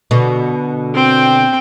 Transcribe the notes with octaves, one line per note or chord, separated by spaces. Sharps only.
B2 D3
C4 G5